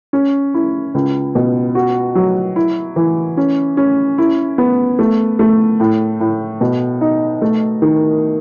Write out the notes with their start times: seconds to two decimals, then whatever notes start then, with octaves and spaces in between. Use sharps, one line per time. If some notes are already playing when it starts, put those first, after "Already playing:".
0.13 C#4
0.54 E4
0.94 C#2
1.35 B2
1.75 F#4
2.15 F#3
2.56 E4
2.96 E3
3.37 C#4
3.77 C#4
4.18 E4
4.58 B3
4.99 A3
5.39 A3
5.80 A2
6.20 A2
6.61 B2
7.01 D#4
7.42 A3
7.82 D#3